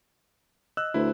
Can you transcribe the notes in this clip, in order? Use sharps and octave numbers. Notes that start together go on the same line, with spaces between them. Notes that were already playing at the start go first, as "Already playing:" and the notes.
D#5 E6 F#6
D2 E4 B4 C5